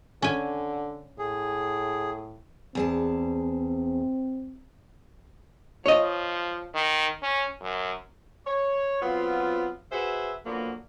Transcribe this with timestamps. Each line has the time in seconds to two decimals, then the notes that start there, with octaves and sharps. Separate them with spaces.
0.22 D3 C#4 G#5
1.18 A2 G#4
2.75 E2 C4 G#4 A5
5.86 F3 C#5 D#5
6.74 D#3
7.23 C#4
7.61 F#2
8.47 C#5
9.02 F#3 B3 C4 F4
9.92 F#4 G#4 B4 C5 E5
10.46 D3 F3 F#3 A#3 B3 F#4